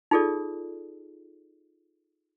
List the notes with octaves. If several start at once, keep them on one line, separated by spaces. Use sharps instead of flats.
D#4 F4 G#4 A4 D5